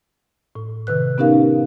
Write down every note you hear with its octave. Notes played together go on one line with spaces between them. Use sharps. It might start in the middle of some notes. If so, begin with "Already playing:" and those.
A2
C3 D#3 B4 F#6
B3 C#4 D#4 G4 A#4 F5